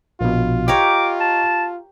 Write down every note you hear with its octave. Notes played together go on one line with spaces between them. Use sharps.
A#1 B2 F4
G4 A#4 C#5 D#5 A#5 C#6 D6
A5